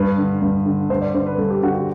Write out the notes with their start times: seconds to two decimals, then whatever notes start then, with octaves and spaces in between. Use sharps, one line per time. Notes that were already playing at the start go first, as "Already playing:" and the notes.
Already playing: G2 B4
0.18 D3
0.42 G2
0.66 D3
0.90 G2 C5
1.02 D5
1.14 D3 C5
1.26 B4
1.38 G2 A4
1.50 G4
1.63 D3 F#4
1.75 F#4